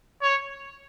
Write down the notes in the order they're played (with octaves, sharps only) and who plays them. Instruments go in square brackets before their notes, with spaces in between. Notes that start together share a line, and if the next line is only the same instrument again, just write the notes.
[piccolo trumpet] C#5